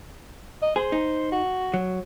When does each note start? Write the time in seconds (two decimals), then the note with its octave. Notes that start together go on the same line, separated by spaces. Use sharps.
0.62 D#5
0.76 G#4 C5
0.92 D#4
1.32 F#4
1.74 F#3